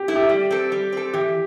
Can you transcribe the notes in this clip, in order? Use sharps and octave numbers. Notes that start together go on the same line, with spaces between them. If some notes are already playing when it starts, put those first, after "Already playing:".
Already playing: G4
A3 E4
G4
G3
C4 A4
G3
C4 A4
E3 G4